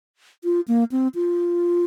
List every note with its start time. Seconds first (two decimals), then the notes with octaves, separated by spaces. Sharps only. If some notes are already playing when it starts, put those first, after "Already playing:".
0.44 F4
0.68 A#3
0.92 C4
1.15 F4